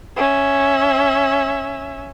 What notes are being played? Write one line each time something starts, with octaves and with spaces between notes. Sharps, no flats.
C#4 E5